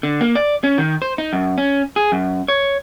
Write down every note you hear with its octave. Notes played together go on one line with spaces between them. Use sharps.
D3
A#3
D5
C#4
D#3
C5
D#4
F#2
C#4
G#4
F#2
C#5